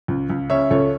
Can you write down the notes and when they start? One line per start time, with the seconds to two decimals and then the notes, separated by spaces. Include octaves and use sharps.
0.08 C#2
0.30 C#2
0.50 C#3 C#5 E5
0.70 C#2 A4 C#5